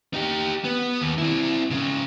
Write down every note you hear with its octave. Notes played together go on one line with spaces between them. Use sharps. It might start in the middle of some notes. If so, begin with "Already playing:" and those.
D#4 G4
B3
D#2
C4 E4
C#3 F3